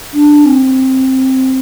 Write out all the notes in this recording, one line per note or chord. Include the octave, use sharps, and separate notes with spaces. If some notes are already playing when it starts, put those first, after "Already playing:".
D4
C4